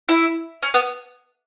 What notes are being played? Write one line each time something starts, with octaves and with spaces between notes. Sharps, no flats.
E4
C#4
B3